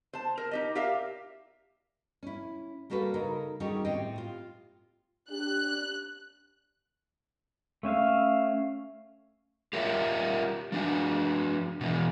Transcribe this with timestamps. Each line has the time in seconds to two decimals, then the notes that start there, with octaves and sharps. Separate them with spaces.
0.13 C5 A5
0.38 A#4
0.51 D#4 G4 D#5
0.75 G4 A#4 D5 E5 F5
2.23 C#4 E4
2.90 G3 A#3 F#4 A4 B4
3.14 C#3 D#4 A4 A#4
3.60 D#3 G3 C#4 D#4 F#4 G#4
3.85 A2 C4 G4 D#5 G5
4.18 F4
5.30 D4 G4 F#6
7.83 A3 C#4 E5 F5
9.73 F4 G4 A#4 C#5 E5
10.72 F3 D4 F#4
11.81 B2 E3